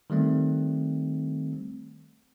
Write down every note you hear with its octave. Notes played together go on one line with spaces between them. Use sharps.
D#3 G3 A3 C4